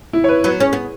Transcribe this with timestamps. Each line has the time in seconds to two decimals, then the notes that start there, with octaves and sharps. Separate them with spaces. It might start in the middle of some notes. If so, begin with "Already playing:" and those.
0.13 E4
0.24 C#5
0.29 B4
0.44 F#3 B3 B4
0.60 C#4 G#4
0.73 B3